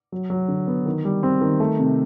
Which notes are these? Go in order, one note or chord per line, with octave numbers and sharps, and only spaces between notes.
F#3
F#3
D3
B3
D#3
G3
C4
D#3
A3
C3